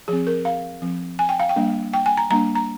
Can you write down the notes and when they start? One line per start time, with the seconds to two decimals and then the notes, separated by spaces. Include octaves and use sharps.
0.08 F3 C4 G#4
0.27 A#4
0.45 F5
0.82 F3 C4
1.19 G#5
1.29 G5
1.40 F5
1.49 G5
1.56 G3 A#3 D4
1.93 G5
2.06 G#5
2.17 A#5
2.30 G3 A#3 D4 A#5
2.55 A#5